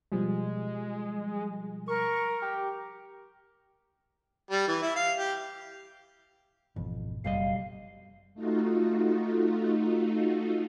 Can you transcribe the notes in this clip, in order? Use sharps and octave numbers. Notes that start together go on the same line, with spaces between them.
B2 F3 G3 G#3
A#4 C#6
G4
G3
E3
E4
F5
G4
G#1 F2 B2 E3
F#1 B1 G3 D#5 F5
A3 D#4 F4 F#4